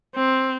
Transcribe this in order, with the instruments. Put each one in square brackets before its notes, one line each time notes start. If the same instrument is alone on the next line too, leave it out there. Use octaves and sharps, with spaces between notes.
[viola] C4